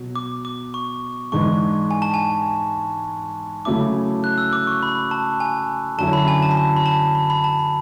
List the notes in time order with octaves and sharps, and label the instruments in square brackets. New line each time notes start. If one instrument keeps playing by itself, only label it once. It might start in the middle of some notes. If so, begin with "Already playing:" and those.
Already playing: [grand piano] B2 F#3
[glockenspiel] D6
D6
C#6
[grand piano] G#2 E3 G#3 D4 [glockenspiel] C#6
[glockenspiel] G#5
A5
G#5
[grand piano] C#3 F#3 A3 C#4 E4 [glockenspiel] D6
[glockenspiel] F#6
E6
D6
C#6
B5
A5
G#5
[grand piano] F#2 D3 F#3 C#4 E4 [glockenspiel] A5
[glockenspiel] B5
G#5
A5
B5
A5
B5
A5
B5
B5
A5
B5